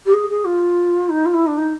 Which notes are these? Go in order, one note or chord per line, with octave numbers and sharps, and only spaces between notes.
G4
G#4
G#4
F4
D#4
F4
E4
D4
D#4